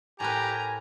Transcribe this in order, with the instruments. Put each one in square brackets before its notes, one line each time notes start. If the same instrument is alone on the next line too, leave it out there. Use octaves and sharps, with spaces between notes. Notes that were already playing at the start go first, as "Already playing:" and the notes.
[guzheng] A2 A#4 B4 [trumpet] G4 [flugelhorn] G#5 [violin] A#5